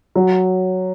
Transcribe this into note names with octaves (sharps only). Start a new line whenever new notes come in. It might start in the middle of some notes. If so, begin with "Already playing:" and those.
F#3